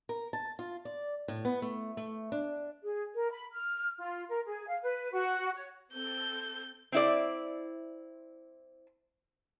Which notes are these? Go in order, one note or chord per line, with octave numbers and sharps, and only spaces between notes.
A#4
A5
F4
D5
A2
B3
A3
A3
D4
G#4
A#4
B5
F6
F4
A#4
G#4
F5
B4
F#4
C#5
C4 A4 G6
C4 E4 D5